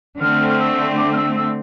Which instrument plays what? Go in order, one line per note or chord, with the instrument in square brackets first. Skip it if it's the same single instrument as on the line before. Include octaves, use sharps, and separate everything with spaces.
[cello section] D3 A3 C4 [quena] F6
[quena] F6
E6
D6
F6
E6
E6